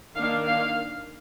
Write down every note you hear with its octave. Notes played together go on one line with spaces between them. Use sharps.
D#3 A#3 D4 F5
F5